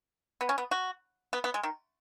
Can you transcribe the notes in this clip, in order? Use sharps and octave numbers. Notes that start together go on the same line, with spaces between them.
B3
C#4
B3
F#4
B3
B3
G#3
D#3